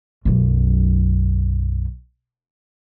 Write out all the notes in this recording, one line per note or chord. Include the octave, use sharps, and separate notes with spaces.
B1 F#2